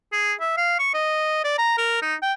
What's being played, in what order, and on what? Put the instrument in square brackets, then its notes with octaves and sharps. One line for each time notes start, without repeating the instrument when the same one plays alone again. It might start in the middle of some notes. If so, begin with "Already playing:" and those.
[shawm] G#4
E5
F5
C#6
D#5
D5
A#5
A#4
D#4
G5